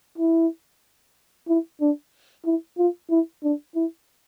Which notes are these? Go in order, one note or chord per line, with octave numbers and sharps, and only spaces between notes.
E4
E4
D4
E4
F4
E4
D4
E4